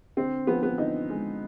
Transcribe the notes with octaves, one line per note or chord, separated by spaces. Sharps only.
D3 C4
F3 B3
B3
D3 D#4
G#3